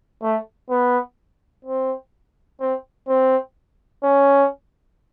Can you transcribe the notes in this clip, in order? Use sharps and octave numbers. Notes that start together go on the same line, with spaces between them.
A3
B3
C4
C4
C4
C#4